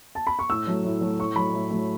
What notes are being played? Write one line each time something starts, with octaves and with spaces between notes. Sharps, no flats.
A5
B5
C#6
A2 E6
F#3 A3
A2
F#3 A3
A2 C#6
F#3 A3 B5
A2
F#3 A3